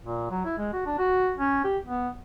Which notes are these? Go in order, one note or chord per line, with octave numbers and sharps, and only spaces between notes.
A#2
F#3
E4
G#3
F#4
D4
F#4
C#4
G4
B3